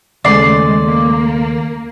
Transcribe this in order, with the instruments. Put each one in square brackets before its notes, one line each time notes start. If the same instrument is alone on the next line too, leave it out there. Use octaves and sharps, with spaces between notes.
[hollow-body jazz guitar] D#2 C#3 A3 [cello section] G#3 [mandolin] D5 C6
[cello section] A#3